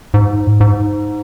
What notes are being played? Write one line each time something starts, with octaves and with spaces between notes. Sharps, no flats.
G#2
G#2